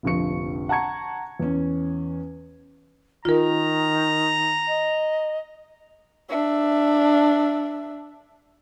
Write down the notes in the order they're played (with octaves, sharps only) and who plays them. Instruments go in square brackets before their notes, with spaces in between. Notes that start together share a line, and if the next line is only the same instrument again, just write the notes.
[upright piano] F1 A#1 D3 F3 C#6 C#7
F#5 A5 A#5 C#6 G#6 C#7
E2 C#4
[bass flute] D#3 [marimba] F4 A#4 [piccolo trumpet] A#5
[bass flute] D#5
[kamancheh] D4 E5